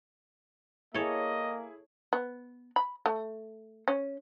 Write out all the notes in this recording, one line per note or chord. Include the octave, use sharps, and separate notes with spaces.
A#3 E4 G#4 A4 C#5 D#5
B3
B5
A3
C#4